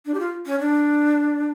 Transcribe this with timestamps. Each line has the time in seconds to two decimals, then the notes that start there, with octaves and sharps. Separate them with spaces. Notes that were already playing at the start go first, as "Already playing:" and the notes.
0.06 D4
0.14 G4
0.20 F4
0.46 C#4
0.60 D4